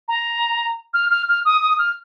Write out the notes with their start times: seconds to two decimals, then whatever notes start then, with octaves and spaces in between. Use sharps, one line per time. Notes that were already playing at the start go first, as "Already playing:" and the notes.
0.08 A#5
0.94 F6
1.10 F6
1.28 F6
1.45 D#6
1.62 D#6
1.78 F6